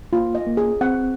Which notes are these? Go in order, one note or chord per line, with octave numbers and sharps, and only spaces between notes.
A#3 F4
D#5
A#3
G#4
C4 F#5